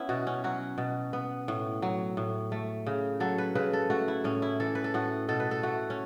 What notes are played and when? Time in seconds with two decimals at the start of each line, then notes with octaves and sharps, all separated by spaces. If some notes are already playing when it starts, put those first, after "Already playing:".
Already playing: B3 C#4 E4
0.09 B2 F#4
0.27 C#4
0.44 F#3 F#4
0.78 B2
1.13 B3
1.48 A2
1.82 F#3
2.17 A2
2.52 A3
2.86 C#3
3.20 F#3 A4
3.38 B4
3.55 C#3 B4
3.73 A4
3.90 A3 F#4
4.08 E4
4.24 A2 C#4
4.42 E4
4.60 E3 A4
4.75 B4
4.84 A4
4.94 A2 F#4
5.29 B2 A4
5.40 B4
5.51 A4
5.63 A3 F#4
5.90 C#4